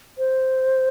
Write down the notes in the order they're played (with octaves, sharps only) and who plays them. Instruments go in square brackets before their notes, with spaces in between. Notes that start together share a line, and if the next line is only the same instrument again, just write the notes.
[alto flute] C5